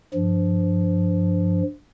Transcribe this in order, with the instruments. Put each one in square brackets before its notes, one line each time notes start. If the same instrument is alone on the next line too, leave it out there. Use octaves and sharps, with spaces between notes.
[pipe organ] G2 F3